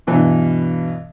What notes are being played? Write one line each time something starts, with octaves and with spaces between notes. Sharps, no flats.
G2 B2 E3 D4